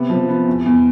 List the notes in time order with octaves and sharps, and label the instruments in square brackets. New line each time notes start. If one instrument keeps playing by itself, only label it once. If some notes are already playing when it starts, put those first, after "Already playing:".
Already playing: [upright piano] C3 B3
F3
B3
E2
E2